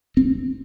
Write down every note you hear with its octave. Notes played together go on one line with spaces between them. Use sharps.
C4